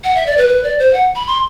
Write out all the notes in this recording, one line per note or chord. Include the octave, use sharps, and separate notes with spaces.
F#5
E5
D5
B4
B4
D5
C5
F#5
B5
C6